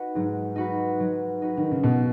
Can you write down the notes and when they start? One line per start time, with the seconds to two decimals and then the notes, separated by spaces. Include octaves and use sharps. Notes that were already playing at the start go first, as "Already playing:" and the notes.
Already playing: D#4 F#4 B4
0.15 G#2 F#3
0.56 D#4 F#4 B4
1.00 F#3
1.42 D#4 F#4 B4
1.57 D#3
1.71 C#3
1.84 B2 F#3